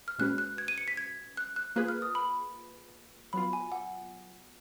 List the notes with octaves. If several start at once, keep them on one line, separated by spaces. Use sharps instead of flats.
F6
A#2 G#3 C#4 F#4 B4 F#6
F#6
G#6
D#7
C#7
B6
G#6
F#6
F#6
A#3 F4 G#4 B4 F#6
F6
D#6
B5
F#3 B3 F4 B5
G#5
F#5